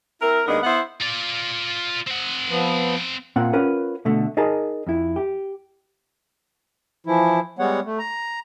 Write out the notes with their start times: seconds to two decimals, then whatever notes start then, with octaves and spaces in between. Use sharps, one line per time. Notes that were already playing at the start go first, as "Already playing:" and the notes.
0.21 C4 E4 A#4
0.46 D#2 G#3 B3 D4 A#4
0.63 B3 E4 C5 F#5
1.00 F4 D5
2.07 C4 F#5
2.48 F3 B3
3.36 A#2 C4 F5 F#5
3.53 C#4 F4 A#4 B4 F#5
4.05 B2 D3 A3
4.37 D#4 G#4 A#4 D#5 G#5 A5
4.87 F2 E4
5.16 G4
7.07 E3 F3 E4
7.59 G3 G#3 B3 C#5 F#5
7.85 A3
7.99 A#5